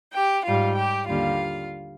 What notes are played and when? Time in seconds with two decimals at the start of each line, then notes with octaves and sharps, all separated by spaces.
0.13 G4 G5
0.45 G#2 G3 F4 F5
0.77 G4 G5
1.08 D#2 D3 G3 F4 F5